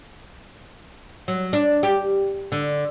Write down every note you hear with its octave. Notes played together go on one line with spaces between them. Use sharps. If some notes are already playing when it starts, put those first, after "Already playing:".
F#3
D4
G4
D3